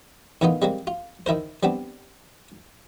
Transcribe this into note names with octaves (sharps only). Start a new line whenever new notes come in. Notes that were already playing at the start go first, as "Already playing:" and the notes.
A2 D#3 E3 B3 D#4 F4
G3 G#3 A#3 C4
F4
D#3 E4 A#4 C5
G3 B3 C4 D4